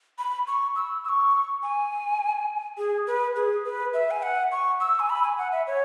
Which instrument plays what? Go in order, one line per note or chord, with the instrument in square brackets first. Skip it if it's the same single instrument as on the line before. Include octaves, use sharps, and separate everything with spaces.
[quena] B5
C#6
E6
E6
C#6
G#5
G#4
B4
G#4
B4
E5
G#5
F#5
C#6
E6
G#5
B5
G#5
F#5
E5
C#5